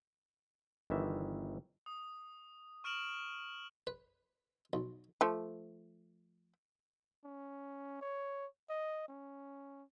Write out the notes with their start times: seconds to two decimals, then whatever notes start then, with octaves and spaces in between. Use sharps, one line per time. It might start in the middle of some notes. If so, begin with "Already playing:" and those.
0.90 G1 D#3 E3 E5
1.86 D#6
2.84 C#6 F6 D7 E7 F#7
3.87 B4
4.73 B1
5.21 F3 A3
7.24 C#4
8.01 C#5
8.70 D#5
9.08 C#4